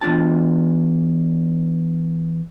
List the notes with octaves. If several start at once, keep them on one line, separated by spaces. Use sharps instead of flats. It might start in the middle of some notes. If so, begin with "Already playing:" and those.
E2 A3 D4 F4 A5